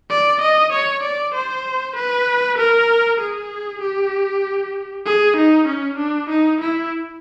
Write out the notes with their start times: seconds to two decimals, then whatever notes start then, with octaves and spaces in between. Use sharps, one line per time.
0.10 D5
0.41 D#5
0.72 C#5
1.03 D5
1.34 C5
1.96 B4
2.58 A#4
3.20 G#4
3.82 G4
5.05 G#4
5.37 D#4
5.67 C#4
5.98 D4
6.29 D#4
6.60 E4